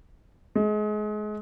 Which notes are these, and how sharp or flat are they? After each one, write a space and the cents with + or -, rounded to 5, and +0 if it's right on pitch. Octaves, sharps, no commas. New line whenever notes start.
G#3 +30